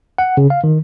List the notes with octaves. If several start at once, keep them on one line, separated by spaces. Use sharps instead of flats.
F#5
C#3
F5
D#3